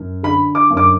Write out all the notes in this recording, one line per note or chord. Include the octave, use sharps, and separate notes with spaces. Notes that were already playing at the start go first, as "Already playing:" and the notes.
Already playing: F#2
D3 B5
D6
F#2
D6